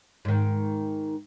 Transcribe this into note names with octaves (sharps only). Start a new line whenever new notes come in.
G#2 D#3